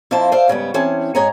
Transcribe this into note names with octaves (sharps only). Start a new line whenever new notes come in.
F2 A#3 E4 C5 A5
C5 D5 E5 F5
G#2 C#3 G3 B3
E3 C4 C#4 G#4 A5
G#2 G#4 C#5 D#5 G#5 A#5